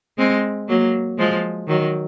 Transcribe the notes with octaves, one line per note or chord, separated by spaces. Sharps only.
G#3 C4
F#3 A#3
F3 G#3
D#3 F#3